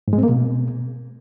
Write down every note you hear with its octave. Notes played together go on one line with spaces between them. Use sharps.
G#2
G#3
C4
A#3
B2